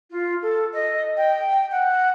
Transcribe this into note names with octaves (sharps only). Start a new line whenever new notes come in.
F4
A4
D#5
G5
F#5